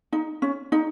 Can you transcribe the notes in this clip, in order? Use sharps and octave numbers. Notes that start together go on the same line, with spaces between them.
D#4
C#4
D#4